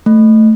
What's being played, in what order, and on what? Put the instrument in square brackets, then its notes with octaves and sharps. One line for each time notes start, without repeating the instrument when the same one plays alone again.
[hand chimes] A3